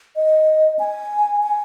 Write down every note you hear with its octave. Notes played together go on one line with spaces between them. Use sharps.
D#5
G#5
G#5